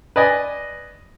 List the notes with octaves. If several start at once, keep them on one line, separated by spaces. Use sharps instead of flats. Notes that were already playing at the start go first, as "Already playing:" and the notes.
B4 D5 D#5 G#5